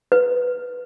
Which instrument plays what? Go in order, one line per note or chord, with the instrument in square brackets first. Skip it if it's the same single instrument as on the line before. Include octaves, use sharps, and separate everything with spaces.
[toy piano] B4